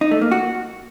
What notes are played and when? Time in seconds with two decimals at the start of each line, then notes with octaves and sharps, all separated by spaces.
0.01 D#4
0.11 A3
0.21 A#3
0.31 F#4